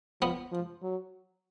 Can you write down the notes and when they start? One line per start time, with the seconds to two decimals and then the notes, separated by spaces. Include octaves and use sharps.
0.21 F3 B3
0.52 F3
0.82 F#3